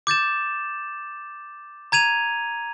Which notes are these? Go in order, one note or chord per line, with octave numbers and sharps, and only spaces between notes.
D6 G6 A6 E7
A#5 G#6 D#7 F7